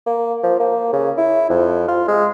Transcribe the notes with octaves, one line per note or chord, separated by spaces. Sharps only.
A#3
F3
A#3
C#3
E4
F2
F4
G#3